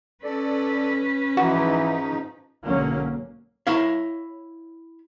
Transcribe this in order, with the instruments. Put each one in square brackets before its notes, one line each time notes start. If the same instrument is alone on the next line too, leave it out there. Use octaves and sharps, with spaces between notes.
[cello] C#4 B4 [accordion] A4 D5
[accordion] G#2 F3 D#4 [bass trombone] E3 [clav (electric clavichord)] F#4
[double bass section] B1 G#2 D3 F#3 A#3 C#4
[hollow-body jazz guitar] E4 C#5 F5